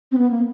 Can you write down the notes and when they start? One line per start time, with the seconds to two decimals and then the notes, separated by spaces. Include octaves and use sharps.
0.12 C4
0.18 B3
0.31 A#3